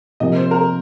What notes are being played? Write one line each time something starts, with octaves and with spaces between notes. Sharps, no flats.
C3 F3 A#3 G4 D#5
C5
A#4